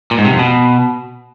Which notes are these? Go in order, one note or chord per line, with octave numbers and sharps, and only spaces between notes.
A#2
G#2
C3
F2
B2